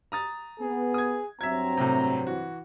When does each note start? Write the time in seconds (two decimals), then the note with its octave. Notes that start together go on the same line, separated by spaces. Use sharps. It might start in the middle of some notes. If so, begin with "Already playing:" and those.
0.12 A#5 D#6 A6
0.60 B3 G#4
0.94 D#6 G#6
1.41 G2 F#3 C4 E5 A#5 G#6
1.77 A2 C3
2.26 E3 F#4